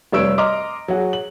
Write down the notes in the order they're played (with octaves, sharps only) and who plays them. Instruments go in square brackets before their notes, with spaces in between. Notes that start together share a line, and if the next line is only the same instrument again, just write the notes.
[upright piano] F1 G3 C#5 E6 D7
D#5 A#5 C6 D6 F6
F#3 F#4 G#4
F#7